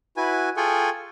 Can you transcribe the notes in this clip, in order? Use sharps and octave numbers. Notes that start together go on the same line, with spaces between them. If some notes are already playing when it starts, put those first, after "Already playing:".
E4 F#4 B4 G#5
F4 G#4 A4 G5 G#5 C#6